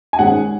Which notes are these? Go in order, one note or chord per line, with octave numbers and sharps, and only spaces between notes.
G#5
G#2 D#3 G#3 C#4 F#5